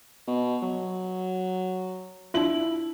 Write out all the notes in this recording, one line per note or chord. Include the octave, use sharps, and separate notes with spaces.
B2
F#3
D4 E4 F4 F#7